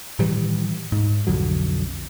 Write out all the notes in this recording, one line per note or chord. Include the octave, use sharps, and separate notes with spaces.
A2 D#3 E3 G3
G#2
B1 F2 D3 F#3